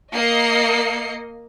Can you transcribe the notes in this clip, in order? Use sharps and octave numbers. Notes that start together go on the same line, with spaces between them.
A#3 D#5 C7 C#7